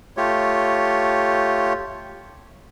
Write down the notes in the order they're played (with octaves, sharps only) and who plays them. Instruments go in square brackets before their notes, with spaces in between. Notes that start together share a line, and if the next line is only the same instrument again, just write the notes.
[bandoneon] A3 F4 G4 C#5